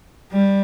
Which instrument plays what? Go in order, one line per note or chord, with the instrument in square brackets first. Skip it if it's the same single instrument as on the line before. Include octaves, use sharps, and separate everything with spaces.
[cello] G3